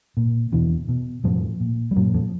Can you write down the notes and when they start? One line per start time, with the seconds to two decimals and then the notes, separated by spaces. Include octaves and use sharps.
0.17 A#2
0.52 E2 B2 E3
0.89 B2
1.24 F2 A2 F3
1.60 A#2
1.91 G3
1.96 F#2 A#2 F#3
2.14 F2 F3